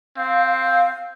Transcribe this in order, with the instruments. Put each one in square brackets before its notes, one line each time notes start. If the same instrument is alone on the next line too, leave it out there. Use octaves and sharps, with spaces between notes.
[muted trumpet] C4 [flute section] F5